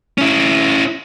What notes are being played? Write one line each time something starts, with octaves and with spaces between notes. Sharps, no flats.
C#4 E4